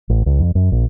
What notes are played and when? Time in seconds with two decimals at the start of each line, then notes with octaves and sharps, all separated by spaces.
0.10 A1
0.26 C#2
0.39 F2
0.55 F#2
0.72 A#1